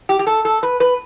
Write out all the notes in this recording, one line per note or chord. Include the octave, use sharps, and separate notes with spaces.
G4
G4
A4
A4
B4
B4